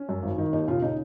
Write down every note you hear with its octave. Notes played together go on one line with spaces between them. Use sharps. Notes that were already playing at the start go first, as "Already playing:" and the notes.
Already playing: C#4
F#2
G#1
D#3
D#2 D#4
C#3 F4
C#3 D#4